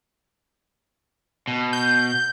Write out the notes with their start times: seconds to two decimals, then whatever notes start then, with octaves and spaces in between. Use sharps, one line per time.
1.47 B2
1.73 G6